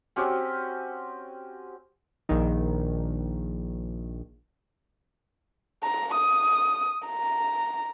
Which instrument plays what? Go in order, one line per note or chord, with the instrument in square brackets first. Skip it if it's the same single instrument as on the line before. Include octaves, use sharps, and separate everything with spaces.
[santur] C4 C#4 F#4 G4
[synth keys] A#1 D#3
[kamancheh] A#5
D#6
A#5